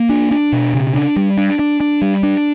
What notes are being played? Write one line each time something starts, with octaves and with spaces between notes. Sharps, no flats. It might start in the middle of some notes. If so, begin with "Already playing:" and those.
Already playing: A#3
D4
D4
B2
C#3
D4
G3
D4
D4
D4
G3
D4